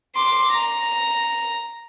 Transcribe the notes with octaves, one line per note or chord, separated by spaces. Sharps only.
C6 D6
A#5